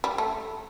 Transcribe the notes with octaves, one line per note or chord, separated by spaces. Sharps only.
G3
A3